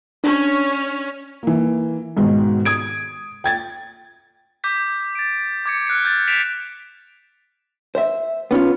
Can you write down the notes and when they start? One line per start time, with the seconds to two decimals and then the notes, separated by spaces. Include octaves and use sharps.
0.24 C#4 D4 C#5
1.43 E3 A#3
2.17 G#2 B2 D#3 G#3
2.65 D#6 G#6 D7
3.44 G5 G#6 A6
4.64 D6 G6 B6
5.15 A6 D7
5.66 D6 G#6 C#7
5.87 F6 F#6 G#6 C7 C#7
6.05 G6 A6
6.27 A6 B6 D7 E7 F7
7.95 C5 E5
8.51 B3 C#4 D#4 F4